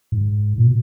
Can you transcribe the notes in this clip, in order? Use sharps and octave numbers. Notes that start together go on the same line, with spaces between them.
G#2
A#2
B2